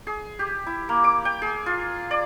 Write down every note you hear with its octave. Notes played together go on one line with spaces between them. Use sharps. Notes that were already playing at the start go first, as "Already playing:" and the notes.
G#4
G4
E4
A#3
D6
G5
G#4
F4
D5